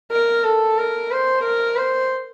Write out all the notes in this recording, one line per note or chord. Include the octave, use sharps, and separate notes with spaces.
A#4
A4
A#4
C5
A#4
C5